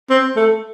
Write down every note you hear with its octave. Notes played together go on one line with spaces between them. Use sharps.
C4
A3